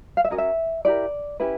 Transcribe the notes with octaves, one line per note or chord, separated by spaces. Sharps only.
F5
E5
C#4 F#4 A#4 D#5
E5
E4 G4 A#4 D5
C#4 E4 G4 B4